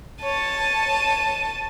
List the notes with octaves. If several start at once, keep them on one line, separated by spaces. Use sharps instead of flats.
C#5 A5 D#7